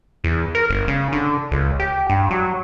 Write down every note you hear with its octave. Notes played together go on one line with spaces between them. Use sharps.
E2
A#4
G1
C#3
D3
C#2
G4
G2
F#3